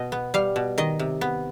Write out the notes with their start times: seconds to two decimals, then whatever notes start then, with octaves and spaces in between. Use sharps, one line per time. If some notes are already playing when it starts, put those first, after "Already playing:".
Already playing: B2 D#5
0.12 B3
0.34 G3 F5
0.56 B2
0.78 D#3 D#5
0.99 C3
1.21 B3